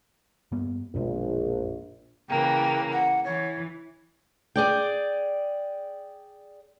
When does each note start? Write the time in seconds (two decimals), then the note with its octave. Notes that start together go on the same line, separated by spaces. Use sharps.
0.52 G2 A#3 B3
0.95 A#1 F#2 B2 G#3
2.29 C#3 E3 A#3 G5
2.93 F#5
3.25 E3 C#5
4.56 G#4 D5 G5